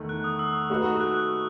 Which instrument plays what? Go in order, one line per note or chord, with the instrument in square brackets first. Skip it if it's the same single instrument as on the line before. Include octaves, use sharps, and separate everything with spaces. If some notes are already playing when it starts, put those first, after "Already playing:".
Already playing: [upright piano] E2 D#3 A3
[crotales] F#6
D#6
E6
[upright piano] A3 D#4 F#4 B4
[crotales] F#6